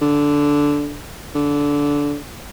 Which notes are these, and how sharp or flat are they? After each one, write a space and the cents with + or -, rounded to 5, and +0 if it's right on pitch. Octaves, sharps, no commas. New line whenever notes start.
D3 -10
D3 -15